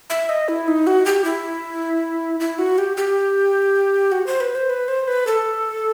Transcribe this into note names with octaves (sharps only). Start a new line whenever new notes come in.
E5
D#5
E4
D#4
F#4
G4
E4
E4
F#4
G4
G4
F#4
C5
B4
C5
B4
C5
B4
A4